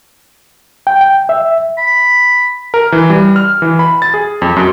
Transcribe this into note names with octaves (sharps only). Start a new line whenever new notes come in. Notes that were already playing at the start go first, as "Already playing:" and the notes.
G5
G5
E5
B5
A#4
E3
G3
F6
E3
B5
A6
G#4
F2
F#2